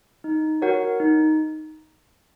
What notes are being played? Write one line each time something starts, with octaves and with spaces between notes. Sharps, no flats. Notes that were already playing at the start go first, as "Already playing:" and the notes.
D#4
F#4 A#4 C#5 F#5
D#4